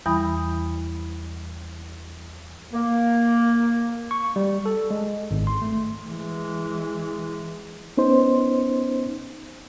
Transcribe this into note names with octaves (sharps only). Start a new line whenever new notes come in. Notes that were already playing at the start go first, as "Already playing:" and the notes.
E2 E3 G3 E4 B5 D#6
A#3
C#6
G3
A4
G#3
G#1
C6
A3
E3 G#3
B3 C#4 D#4 C5